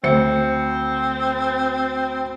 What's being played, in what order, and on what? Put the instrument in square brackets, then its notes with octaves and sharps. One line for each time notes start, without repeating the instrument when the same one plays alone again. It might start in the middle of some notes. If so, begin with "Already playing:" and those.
[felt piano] D2 C5 C#7 [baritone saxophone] C4